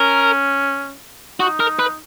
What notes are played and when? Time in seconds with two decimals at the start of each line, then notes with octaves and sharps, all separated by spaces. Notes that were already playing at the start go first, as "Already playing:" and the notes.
Already playing: C#4 A#4
1.40 D#4 F#4
1.60 A#4
1.79 B4